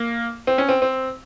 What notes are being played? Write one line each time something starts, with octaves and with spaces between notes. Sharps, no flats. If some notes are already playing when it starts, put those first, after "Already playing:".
Already playing: A#3
C4
C#4
C4
C4